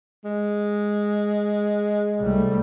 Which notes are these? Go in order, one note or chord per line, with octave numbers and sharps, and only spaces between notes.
G#3
C2 G3 A3